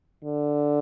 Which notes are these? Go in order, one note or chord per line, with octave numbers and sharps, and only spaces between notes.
D3